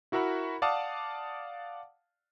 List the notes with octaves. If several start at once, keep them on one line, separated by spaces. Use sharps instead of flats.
E4 F#4 A#4 E5 F#5 B5
D5 F5 F#5 A5 D6 D#6